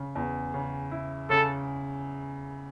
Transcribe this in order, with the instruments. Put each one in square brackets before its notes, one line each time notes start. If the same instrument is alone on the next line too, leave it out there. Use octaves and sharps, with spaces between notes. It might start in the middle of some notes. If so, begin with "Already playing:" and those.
Already playing: [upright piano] C#3
E2
C#3
E4
[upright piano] C#3 [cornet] A4